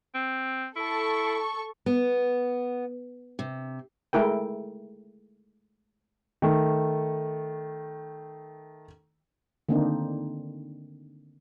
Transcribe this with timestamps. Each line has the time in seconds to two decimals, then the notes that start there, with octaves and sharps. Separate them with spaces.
0.15 C4
0.76 E4 A4 C#6
1.86 B3
3.39 C3
4.13 G#3 A3 E4 A#4 G5
6.42 D#3 A3
9.69 D3 D#3 A#3 C4 D4 D#4